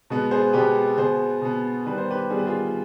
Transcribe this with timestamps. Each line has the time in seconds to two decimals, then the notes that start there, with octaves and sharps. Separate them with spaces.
0.10 B2 G#3 B3
0.31 G#4 C5
0.53 B2 G#3 B3 G4 B4
0.97 B2 B3 G#4 C5
1.41 B2 B3
1.86 D#3 G3 B3 B4
1.98 C5
2.10 G4 B4
2.30 D#3 G3 B3 G#4
2.38 B4
2.46 F4 G#4